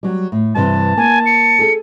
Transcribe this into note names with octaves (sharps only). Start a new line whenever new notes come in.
F#3 G3
A2
G2 C3 E3 A5
A#3 G#5
C#7
G#4 A4